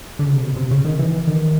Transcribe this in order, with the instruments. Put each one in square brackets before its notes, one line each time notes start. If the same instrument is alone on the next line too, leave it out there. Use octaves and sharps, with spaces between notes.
[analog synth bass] D3
C#3
C3
B2
C3
C#3
D#3
E3
D#3